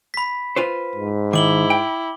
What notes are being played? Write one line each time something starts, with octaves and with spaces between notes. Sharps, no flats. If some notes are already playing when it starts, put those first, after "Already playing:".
B5 B6
F4 B4 C5
G#2
D#3 E4 D6 F#7 G7
G5